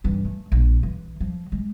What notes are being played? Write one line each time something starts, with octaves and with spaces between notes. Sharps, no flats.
G2 E3
A3
A#1
E3
F3
G#3